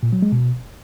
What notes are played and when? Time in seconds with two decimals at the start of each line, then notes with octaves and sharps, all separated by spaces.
0.03 A#2
0.13 F#3
0.22 G#3
0.32 B2